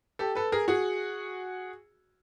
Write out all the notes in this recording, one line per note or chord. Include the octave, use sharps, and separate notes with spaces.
G4 A4
A4 B4
G#4 A#4
F#4 G#4